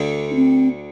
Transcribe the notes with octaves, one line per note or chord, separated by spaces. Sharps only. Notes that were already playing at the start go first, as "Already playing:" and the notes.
Already playing: D2 D3
D4
C4